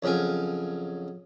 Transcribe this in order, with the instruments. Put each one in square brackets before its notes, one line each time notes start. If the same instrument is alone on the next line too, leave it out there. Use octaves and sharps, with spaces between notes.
[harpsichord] F2 C#3 F#3 A#4 G#5